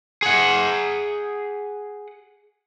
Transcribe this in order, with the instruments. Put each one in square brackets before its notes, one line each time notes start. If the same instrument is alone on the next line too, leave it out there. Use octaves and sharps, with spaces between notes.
[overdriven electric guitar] G#4 F#5